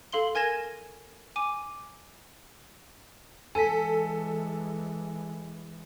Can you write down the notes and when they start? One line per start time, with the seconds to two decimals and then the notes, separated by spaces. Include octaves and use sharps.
0.12 A4 F5 C6 G7
0.35 A#4 G#5 G#6 A#6 E7
1.36 G#5 D6 D#7
3.55 E3 G#3 A4 G#5 B6